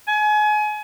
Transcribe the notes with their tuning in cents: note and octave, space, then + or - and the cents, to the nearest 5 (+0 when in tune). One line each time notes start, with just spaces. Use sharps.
G#5 +30